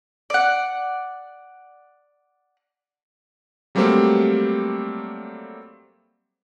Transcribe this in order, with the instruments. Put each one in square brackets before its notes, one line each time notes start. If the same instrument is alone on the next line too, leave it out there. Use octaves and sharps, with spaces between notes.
[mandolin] D5 F#5
[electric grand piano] F#3 G3 A3 A#3 C4 G4